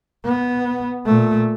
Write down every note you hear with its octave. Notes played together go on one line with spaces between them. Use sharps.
B3
A#2 A3